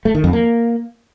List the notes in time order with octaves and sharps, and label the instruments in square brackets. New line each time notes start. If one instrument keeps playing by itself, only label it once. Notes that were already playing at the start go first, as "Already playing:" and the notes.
[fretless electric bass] A3
D#3
F2
A#3